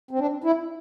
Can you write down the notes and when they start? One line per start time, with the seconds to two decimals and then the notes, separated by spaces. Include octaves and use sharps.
0.11 C4
0.19 D4
0.44 E4